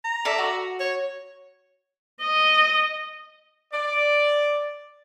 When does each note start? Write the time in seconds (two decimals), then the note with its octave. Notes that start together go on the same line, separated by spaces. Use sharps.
0.04 A#5
0.25 A4 D5 E5
0.38 F#4
0.80 C#5
2.22 D#5
3.74 D5